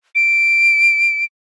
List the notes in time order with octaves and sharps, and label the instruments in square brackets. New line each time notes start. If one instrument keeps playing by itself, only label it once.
[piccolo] D7